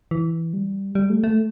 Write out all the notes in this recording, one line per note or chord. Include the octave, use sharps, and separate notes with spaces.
E3
G3
G3
A3
A3